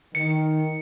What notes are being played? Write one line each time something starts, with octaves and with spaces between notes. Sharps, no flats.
D#3 C#7